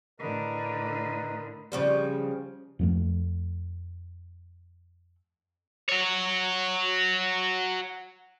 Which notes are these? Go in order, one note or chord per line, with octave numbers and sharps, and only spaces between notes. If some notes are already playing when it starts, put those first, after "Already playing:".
A2 D3 A#4 B4 D#5
C#3 F3 G3
F2 F3 A3
F#4 C#5